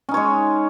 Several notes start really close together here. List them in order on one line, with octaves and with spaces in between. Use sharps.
C#4 D#4 C#5 G#3